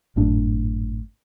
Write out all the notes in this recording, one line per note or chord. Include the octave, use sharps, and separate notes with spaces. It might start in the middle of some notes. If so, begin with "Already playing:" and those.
G#1 F#2 A2 D4